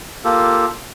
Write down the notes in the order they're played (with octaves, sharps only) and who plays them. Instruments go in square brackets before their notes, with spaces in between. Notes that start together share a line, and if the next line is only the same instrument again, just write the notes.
[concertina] A#3 F4 G4 A4